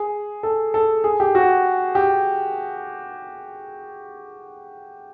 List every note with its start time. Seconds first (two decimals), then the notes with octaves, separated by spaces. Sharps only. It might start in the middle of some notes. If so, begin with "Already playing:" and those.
Already playing: G#4
0.43 A4
0.74 A4
1.04 G#4
1.20 G4
1.35 F#4
1.95 G4